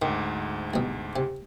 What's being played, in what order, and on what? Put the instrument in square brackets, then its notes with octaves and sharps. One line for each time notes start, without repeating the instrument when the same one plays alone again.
[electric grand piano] D2 G#2 [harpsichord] D#3
[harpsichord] C2 B2
C3